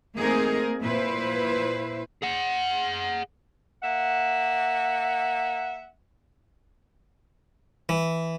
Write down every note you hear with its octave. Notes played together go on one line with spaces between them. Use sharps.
A3 A#3 C4 D#4 G#4 A#4
A#2 E4 B4 C5
G#4 F#5
A#3 E5 F#5
E3